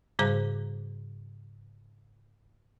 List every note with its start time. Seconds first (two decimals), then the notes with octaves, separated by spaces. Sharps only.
0.19 G#2 C#3 G3 G#4 C5 A#5